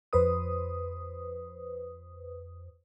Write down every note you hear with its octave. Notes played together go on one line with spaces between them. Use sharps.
F2 B4 C5 D#6